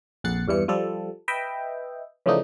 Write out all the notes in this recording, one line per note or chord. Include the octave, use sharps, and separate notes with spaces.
A#1 F2 F#5 A6 C7 C#7
E2 G2 E3 C#7
F3 G3 A4
B4 D#5 E5 G5
C#3 E3 F3 A3 D4 D#4